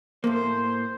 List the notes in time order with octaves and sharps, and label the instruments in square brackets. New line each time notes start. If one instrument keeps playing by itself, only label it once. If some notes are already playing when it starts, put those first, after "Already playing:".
[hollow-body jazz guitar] A2 A3 A#3 [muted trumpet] C5